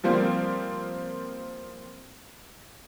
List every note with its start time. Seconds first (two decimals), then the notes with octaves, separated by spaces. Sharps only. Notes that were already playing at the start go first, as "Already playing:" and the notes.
0.04 F3 G3 A#3 C4